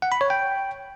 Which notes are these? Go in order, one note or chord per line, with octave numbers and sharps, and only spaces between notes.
F#5
B5
C#5
G5